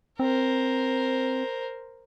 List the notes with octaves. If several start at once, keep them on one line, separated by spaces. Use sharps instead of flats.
C4 A#4 C5